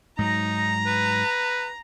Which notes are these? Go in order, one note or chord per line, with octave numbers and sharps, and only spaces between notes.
G#2 F#3 D#4 A#5
B4